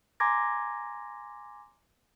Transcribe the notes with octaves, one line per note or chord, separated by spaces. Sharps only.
G#5 A#5 C6 D6 G#6 A#6